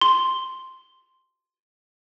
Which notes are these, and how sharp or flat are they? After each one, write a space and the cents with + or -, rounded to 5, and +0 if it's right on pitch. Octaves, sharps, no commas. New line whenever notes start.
C6 +0